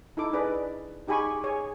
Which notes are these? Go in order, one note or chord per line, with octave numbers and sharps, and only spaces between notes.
D#4 E4 A4 D6
D4 G#4 B4 D5 D#5
D#4 G4 G#4 G#5 B5 C#6
G#4 C#5 G#5